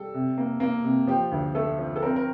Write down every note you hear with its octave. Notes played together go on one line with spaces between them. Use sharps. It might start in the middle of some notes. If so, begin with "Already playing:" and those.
Already playing: G3 A4
C3
A#3
A#3
C3
F3 G4
D2
A3 A4
F3
A4
C4 A#4
A#4